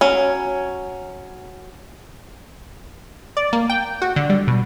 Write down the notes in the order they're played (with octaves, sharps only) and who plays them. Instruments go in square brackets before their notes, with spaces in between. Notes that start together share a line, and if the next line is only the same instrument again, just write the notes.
[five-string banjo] F#3 C#4
[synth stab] D5
A#3
G5
F#4
D3
G3
B2